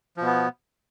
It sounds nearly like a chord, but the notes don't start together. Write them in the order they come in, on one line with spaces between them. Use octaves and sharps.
F3 B2 B3